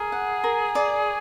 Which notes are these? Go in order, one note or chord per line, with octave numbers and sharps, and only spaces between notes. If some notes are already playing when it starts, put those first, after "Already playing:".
Already playing: G#4 A#4
F#5
A#4
D5